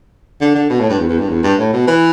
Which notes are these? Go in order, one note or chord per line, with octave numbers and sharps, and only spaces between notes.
D3
D3
B2
A2
G2
E2
E2
G2
E2
G2
A2
B2
E3